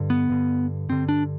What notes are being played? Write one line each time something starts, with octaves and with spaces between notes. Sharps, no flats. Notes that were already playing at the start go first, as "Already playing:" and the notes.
Already playing: G2 D3
B3
G2 D3
G2 D3 C4
D4